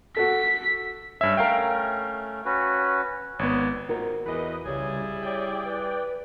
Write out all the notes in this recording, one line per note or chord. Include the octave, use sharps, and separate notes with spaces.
F#4 A4 B6
G2 C#4 C#5 E5
A3 C#4 A#4 F5 G5
C#4 F#4 B4
G#1 B3 C#5
A#2 C4 D#4 F#4 A#4
E2 B4 D#5
C2 C#3 G3 E4 G#4 C#5
C#5 D5 G5
B4